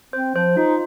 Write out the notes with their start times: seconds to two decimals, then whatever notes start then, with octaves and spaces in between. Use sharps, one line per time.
0.13 C4 C5
0.35 F3 C5
0.57 D#4 F4